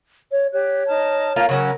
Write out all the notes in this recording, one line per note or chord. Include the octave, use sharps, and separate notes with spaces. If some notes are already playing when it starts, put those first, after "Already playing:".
C#5
G4 C#5 F#6
D#4 A5 F6
A#3 F4 F5 A5
C#3 F#3 C#4 A#4 C#5